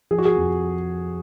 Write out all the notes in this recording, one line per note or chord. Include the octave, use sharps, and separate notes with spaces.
F3 G#4
F#4
G#4
F2